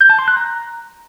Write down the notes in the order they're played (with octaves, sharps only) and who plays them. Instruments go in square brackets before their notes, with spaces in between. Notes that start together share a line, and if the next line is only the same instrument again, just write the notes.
[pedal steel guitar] G6
A5
C6
F#6
A#5